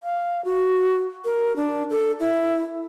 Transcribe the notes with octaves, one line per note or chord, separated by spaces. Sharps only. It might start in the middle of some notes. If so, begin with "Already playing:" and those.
F5
F#4
A#4
D4
A4
E4